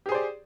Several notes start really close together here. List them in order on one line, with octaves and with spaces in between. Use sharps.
G4 G#4 C5 D5